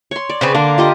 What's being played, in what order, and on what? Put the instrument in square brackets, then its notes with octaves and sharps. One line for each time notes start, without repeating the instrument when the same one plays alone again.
[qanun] C#5 C6
D5
[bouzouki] C#3 B3 C4
[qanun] D3 [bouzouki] A#3 D4
[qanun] F4 G4 D#5